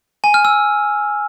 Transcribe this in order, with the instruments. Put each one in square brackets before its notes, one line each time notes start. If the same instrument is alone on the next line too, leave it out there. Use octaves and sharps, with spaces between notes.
[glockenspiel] G#5
F6
E6